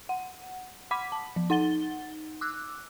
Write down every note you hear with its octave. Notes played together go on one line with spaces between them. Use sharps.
F#5
F#5 B5 D6 B6
A5
F3
D#4 F#5 A6 G7
D6 E6 F#6